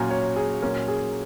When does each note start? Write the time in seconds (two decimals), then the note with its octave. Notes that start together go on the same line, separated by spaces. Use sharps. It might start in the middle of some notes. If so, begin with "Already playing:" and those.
Already playing: A#2 F#3 C#4 G#5 A#5
0.10 C#5
0.36 G#4
0.62 A#2 F#3 C#4 A#4
0.88 G#4